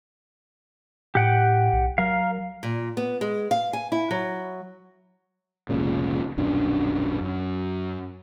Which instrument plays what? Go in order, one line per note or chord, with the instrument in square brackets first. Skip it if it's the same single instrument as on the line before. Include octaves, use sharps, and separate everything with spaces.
[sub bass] A2 [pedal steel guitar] G4 F#5 G5
[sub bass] B1
[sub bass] F#3 [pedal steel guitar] A#4 F5
[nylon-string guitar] A#2
B3
G#3
F5
G#5
E4
F#3
[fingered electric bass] F1 C#2 A#2 C#3
D#1 B1 F#2 D4
F#2